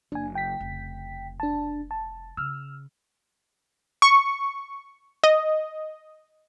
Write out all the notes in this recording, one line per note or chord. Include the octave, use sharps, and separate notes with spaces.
F#1 D4 G#5
G5 B6
F1 C#3
D4 A5
A5
C#3 E6 F6
C#6
D#5